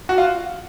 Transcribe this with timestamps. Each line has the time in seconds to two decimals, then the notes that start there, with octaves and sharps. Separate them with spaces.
0.09 F#4
0.18 F4